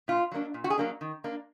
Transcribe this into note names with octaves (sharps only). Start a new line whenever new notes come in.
A#2 F4
F#3 A#3 D4
A#2
F#4
G#4
F#3 A#3 D4
D#3
A#3 D4